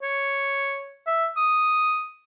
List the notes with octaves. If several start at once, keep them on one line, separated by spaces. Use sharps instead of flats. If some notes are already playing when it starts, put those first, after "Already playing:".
C#5
E5
D#6